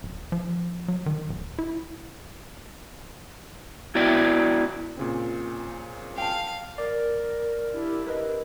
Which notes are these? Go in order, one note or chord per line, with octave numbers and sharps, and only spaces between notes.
D1
F3
F#3
D#3
D1
E4
B3 E4 F#4 D5 E5 G5
A#2 C#3 C4
F5 G5 A5
A#4 D5
D4 E4 G4
A#4 B4 D#5